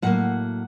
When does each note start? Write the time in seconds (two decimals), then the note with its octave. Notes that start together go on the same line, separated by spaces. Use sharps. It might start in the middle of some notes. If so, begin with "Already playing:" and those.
0.02 A2 F#3 A#3 F#5